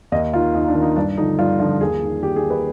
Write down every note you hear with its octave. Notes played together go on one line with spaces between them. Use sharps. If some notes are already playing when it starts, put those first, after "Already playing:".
D#2 D#5
D#3 F4
D#2 D#4
D4
D#3
D#4
G2 D4
D3 F3 D#4
G2 F4
D3 F3 F4
D#2 G#4
D#3
D#2 G4
G#4
D#3
B4